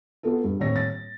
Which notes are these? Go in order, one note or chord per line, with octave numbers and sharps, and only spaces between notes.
B3 F4 G#4 A4
G2
D#1 A2 C4 C#5 A#6
A6